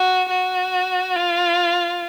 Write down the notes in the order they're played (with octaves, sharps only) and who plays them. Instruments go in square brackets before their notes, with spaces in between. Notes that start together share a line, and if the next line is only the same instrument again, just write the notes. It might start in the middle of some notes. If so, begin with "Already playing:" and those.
Already playing: [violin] F#4
F#4
F4